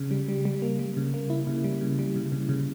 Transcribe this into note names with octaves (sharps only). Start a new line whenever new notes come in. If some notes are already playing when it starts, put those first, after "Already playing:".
Already playing: C#3
G3
G3
G3
A#3
G3
C#3
A#3
E4
C#3
G3
C#3
G3
C#3
C#3
C#3